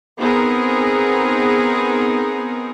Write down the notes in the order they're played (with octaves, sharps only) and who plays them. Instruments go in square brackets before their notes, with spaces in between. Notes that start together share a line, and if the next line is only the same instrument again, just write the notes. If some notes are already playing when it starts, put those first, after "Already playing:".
[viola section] B3 C4 D#4 G#4 A#4